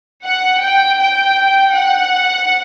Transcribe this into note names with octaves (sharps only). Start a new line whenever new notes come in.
F#5
G5
G5
F#5